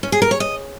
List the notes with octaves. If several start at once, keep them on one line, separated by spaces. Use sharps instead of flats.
C#4
G#4
A#4
C#5
D#5